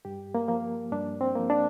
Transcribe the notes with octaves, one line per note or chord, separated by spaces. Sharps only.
G2 G4
A#3
F3 A#3
G2 D4
C4
F3 A#3
D4